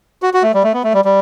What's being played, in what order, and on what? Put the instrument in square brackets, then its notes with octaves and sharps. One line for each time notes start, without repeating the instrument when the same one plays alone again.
[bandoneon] F#4
F#4
A3
G3
A3
B3
A3
G3
G3